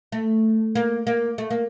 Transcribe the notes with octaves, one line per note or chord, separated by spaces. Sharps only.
A3
A#3
A#3
A3
A#3